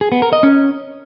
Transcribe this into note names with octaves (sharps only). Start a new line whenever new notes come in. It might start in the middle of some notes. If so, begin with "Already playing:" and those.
G#4
B3
A#4
D#5
C#4